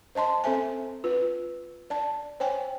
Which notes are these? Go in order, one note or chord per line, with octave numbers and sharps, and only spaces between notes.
C5 D#5 A5 C6
C4 A4 C5 E5 G#5
F4 B4
D5 A5
C5 C#5 G5 G#5